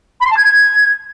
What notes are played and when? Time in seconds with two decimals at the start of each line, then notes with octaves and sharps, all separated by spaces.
0.21 B5
0.27 C6
0.32 A5
0.38 G#6